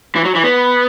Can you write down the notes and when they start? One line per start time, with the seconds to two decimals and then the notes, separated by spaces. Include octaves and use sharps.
0.16 E3
0.25 F#3
0.35 E3
0.44 B3